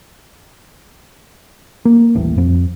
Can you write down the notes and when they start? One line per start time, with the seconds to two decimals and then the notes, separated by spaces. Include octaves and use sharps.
1.85 A#3
2.15 D#1 A1 A2
2.38 F2